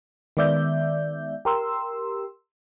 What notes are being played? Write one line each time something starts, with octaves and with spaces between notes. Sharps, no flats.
D#3 G#3 B3 D5 E5 G6
G4 A#4 C6 E6